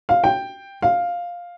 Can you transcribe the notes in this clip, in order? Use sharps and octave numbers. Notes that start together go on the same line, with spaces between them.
F5
G5
F5